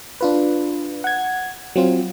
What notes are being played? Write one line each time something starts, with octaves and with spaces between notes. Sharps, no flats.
D4 F4 B4
F#5 G#6
F#3 C4 F4